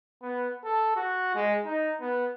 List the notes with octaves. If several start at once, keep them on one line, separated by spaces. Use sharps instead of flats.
B3
A4
F#4
G#3
D#4
B3